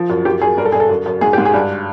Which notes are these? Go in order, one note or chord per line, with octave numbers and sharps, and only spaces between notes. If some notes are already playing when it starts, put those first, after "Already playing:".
Already playing: F3
F#2
F#2 G4
F#2 G#4
G2 A#4
A4
G2 G#4
A4
F#2
F#2
G#2 G#4
G#2 G4
G#4
G2